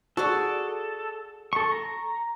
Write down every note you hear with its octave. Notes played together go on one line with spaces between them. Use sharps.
F#4 G#4 A4 D5
A4 C#6
A#5